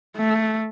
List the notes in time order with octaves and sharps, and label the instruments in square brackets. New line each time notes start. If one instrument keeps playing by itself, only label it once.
[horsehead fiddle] A3